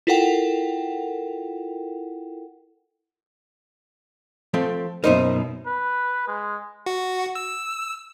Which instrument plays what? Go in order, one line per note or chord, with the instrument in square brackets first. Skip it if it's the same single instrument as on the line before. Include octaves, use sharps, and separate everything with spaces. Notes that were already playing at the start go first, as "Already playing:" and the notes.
[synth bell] E4 F4 A4 A#4 F#5 G5
[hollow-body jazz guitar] F3 A3 C4
[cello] F#2 B2 [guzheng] D#4 [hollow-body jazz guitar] A#4 C5 E5
[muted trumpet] B4
G#3
[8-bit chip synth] F#4
E6